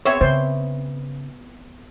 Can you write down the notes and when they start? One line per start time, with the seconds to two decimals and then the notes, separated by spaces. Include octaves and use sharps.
0.05 B3 C4 C#5 E5
0.21 C#3 C5